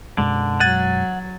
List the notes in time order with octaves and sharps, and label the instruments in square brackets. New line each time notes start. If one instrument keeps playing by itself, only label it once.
[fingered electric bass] F#2 B2 G#3 [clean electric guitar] D3
[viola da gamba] F#3 [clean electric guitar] F#5 [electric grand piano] G#6 A6 D#7